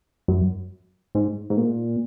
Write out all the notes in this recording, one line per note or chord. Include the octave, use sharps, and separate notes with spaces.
F#2
G#2
G#2
A#2